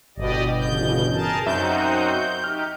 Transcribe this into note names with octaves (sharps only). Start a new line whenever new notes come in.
G1 B2 G4 D5 D#5
E2 C#3 G6
G#4 A#4 A5
F#2 C4 D#4 F#4 E5 G6
D#4 G4 F6